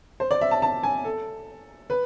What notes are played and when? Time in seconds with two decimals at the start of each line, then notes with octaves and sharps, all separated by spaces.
0.20 C5
0.31 D5
0.41 E5
0.51 A5
0.62 A5
0.83 G#5
1.04 A4
1.90 B4